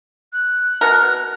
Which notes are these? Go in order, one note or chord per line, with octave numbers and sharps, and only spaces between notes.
F#6
B2 A#4